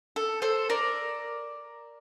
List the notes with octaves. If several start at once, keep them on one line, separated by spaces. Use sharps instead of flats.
A4
A4 C5
A#4 D5